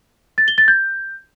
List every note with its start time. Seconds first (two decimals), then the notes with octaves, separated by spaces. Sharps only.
0.38 A6
0.48 G7
0.58 A6
0.68 G6